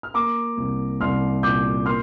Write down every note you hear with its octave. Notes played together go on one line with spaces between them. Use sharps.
F6
A#3 A#5 D6
C2
C2 C6 F6
A#2 D6 G6
A#3 C6 F6